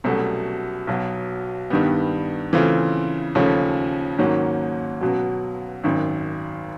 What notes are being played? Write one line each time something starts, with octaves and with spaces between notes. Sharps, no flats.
C2 B2 F#3 A3 C#4
B1 B2 F#3
G2 D#3 G3 B3
C#3 E3 A3 C4 F4
D#2 C#3 F3 A3 C#4
G#2 D#3 F#3 A#3 C#4
C#2 B2 F#3
G#1 F#2 D#3